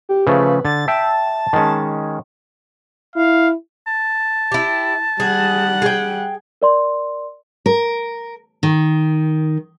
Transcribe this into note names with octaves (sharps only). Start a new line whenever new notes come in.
G4
C#3 F3 A3 B4
D3 A6
E5 G5 A5
D#3 G#3 C#4
E4 F5
A5
E4 G4
G3 G#4 F#5
G#4 G5
A#4 D5 C6
A#4
D#3